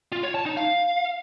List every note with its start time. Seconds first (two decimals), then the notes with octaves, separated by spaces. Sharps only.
0.12 F4
0.23 C#5
0.35 A5
0.46 D#4
0.57 F5